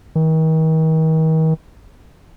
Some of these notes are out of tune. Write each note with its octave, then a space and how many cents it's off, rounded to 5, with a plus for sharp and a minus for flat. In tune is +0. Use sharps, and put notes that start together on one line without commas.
D#3 +40